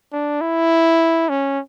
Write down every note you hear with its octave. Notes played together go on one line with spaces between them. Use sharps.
D4
E4
C#4